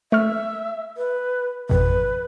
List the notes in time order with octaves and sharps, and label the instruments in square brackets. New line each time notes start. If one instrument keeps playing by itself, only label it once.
[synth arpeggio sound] A3 C#6 F6 [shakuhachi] E5
[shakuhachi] B4
[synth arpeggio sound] G#1 F2 B2 [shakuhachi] B4